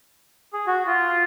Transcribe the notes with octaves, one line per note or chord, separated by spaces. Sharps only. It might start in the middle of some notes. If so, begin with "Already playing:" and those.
G#4
F#4
F4